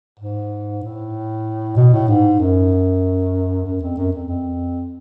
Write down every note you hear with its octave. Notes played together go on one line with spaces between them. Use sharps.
G#2
A2
B2
A2
G#2
F#2
F#2
F2
F#2
F2
F2